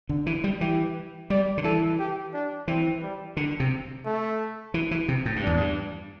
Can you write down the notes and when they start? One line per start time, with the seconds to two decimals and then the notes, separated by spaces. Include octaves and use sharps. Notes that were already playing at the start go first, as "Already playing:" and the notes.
0.09 D3
0.26 E3
0.44 G3
0.61 E3 G4
1.30 G3 D5
1.57 D3
1.64 E3 A4
1.99 G4
2.33 D4
2.68 E3 C4
3.02 G3
3.37 D3
3.60 C3
4.05 A3
4.74 E3
4.91 E3
5.08 C3
5.26 A2
5.36 G2
5.43 E2 D4
5.57 G2